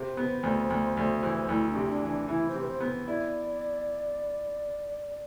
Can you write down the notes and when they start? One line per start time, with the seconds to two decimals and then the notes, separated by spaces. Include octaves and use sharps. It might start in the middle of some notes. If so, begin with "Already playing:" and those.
Already playing: C3 C5
0.17 B3
0.43 D2
0.70 D2
0.97 D2
1.23 E3
1.49 D2 E4
1.69 D4
1.75 C3
1.89 D4
2.02 E3
2.08 D4
2.28 E3 E4
2.48 C5
2.55 C3
2.60 B4
2.67 C5
2.81 B3
3.07 E4 D5